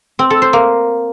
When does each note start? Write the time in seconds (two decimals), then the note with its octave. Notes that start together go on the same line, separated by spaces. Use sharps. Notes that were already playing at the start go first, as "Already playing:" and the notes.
0.19 C4
0.30 A4
0.42 C5
0.53 A#3